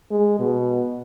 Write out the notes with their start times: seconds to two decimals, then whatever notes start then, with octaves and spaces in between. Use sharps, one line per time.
0.11 G#3
0.39 B2